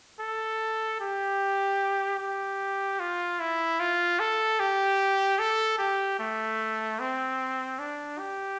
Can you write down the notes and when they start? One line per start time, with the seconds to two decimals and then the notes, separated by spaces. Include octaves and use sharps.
0.19 A4
1.00 G4
2.19 G4
2.99 F4
3.40 E4
3.80 F4
4.19 A4
4.60 G4
5.39 A4
5.78 G4
6.19 A3
7.00 C4
7.79 D4
8.19 G4